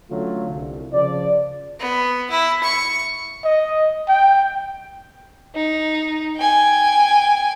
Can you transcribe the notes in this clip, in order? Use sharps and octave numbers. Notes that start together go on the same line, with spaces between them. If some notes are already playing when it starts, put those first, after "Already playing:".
D3 F#3 A3 C#4 F4
C2
C#3 F3 D5
B3
E4
C#6
D#5
G5
D#4
G5 G#5